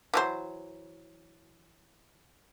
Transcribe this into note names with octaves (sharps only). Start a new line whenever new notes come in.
E3 F#3 C5